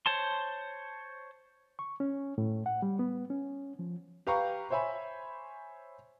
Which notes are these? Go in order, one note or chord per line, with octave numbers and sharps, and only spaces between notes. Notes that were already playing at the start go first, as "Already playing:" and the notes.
C5 C#5 A5 C6
C#6
C#4
A2
F#5
G3
B3
C#4
F3
G4 B4 F5 G5 A#5 C#6
C5 C#5 E5 G#5 B5